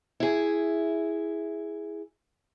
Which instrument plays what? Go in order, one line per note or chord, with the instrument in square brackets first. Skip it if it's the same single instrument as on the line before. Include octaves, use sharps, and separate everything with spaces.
[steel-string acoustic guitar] E4 G#4